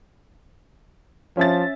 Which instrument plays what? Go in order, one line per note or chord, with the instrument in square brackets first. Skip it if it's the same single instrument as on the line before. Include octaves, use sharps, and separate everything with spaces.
[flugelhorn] F3 [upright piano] C#4 E5 A6